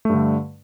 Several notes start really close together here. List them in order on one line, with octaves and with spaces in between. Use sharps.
A3 G2 D3